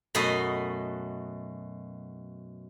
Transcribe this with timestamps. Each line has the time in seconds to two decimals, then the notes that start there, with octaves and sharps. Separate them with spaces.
0.15 F#2 B2 A3 F#4 D#5